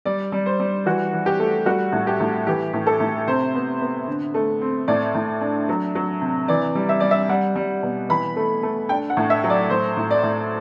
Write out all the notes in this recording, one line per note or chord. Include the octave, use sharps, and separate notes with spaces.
G3 D5
G3
C5
G3
E3 F#4
E3
G4
A3
G3 F#4
A2
G4
A2
E3 G4
A2
A4
A2
C3 C5
B3
B3
D3
A3
C4
A2 D5
A2
D4
F#3
F#3
C3
E3 D5
G3
E5
G3 D5
E5
G3 F#5
G3
B2
E3 B5
A3
A3
D4 G5
F#5
A2
E5
F#3
D5
A2 C5
A2
D5
A2